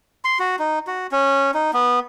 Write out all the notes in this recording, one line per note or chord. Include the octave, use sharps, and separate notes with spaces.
C6
F#4
D#4
F#4
C#4
D#4
B3